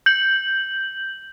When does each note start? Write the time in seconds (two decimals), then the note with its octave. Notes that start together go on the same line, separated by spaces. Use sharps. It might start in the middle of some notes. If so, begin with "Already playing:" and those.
0.06 G6 F#7